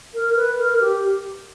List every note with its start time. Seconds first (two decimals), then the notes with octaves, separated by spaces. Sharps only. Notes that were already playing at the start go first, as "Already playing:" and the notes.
0.14 A#4
0.36 B4
0.59 A#4
0.80 G4